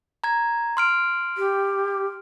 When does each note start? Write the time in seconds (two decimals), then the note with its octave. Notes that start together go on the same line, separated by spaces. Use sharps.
0.24 A#5 G#6
0.77 C6 F6 D7
1.38 G4